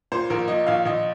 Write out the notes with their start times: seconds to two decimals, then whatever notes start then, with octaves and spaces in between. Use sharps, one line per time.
0.12 A#2 C5
0.30 A#1 A#4
0.48 A#2 D#5
0.67 A#1 F5
0.85 A#1 D#5